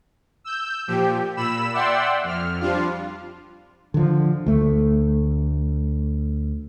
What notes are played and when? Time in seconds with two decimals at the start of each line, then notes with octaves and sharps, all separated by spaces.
0.44 E6 G6
0.87 A#2 F3 G4
1.37 A#2 B5 E6 E7
1.73 D5 E5 F#5 G5 C6 E6
2.23 F2 F6
2.61 F3 G3 D4 F4
3.94 D3 F3
4.46 D2 A3